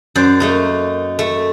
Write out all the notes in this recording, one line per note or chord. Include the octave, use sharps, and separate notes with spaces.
F#2 C5 D5
A3 A#3 D#4
A3